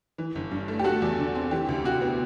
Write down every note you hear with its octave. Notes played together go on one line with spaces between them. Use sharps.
E3
G1
G2
A3
G4
A3 F#4 A4
E2
D3
C4
E3 G4
D2
C3 F#4
B3